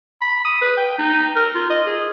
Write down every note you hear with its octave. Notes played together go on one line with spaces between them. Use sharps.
B5
D#6
B4
G5
D#4
A#4
F4
D#5
G#4